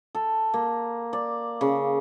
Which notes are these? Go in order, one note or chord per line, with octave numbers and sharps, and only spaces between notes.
A4
A#3
D5
C#3